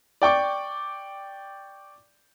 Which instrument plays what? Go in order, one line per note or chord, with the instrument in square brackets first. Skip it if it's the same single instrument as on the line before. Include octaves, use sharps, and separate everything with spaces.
[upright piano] D5 G5 C#6 D6